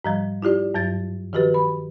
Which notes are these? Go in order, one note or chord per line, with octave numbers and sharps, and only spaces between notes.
G#2 F3 G3
E4 F4 G4 D5
G2 F#3 A6
D#3 F3 F#4 G4 B4
B5